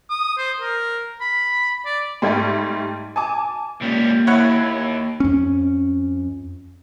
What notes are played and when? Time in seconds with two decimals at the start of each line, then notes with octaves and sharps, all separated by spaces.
0.10 D#6
0.38 C5
0.60 A#4
1.21 B5
1.86 D5
2.22 G#2 G3 A3 G5 G#6
3.16 G#5 A5 D6
3.81 C#2 G3 A#3
4.27 D#2 E4 C#5 F#5
5.20 F2 C#4